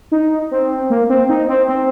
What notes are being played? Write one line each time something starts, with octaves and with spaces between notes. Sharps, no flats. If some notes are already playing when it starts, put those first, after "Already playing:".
D#4
C4
A#3
C4
D#4
C4
C4